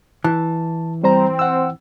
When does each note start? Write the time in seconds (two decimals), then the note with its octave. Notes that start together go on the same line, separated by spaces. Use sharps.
0.24 E3 A5
1.04 G3 C4 C5 A#5
1.39 F#5 E6